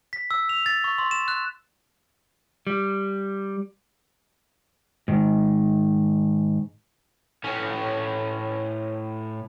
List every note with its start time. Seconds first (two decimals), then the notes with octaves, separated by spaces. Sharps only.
0.13 B6
0.31 E6
0.49 F7
0.66 A6
0.84 C#6
0.98 C6
1.11 E7
1.28 F#6
2.67 G3
5.08 G#2 D#3
7.44 A2 C#4